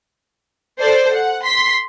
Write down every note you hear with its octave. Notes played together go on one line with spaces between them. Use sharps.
A4 C5 D5
F#5
C6 B6